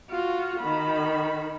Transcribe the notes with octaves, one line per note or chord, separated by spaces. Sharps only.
F4 F#4
D#3 B5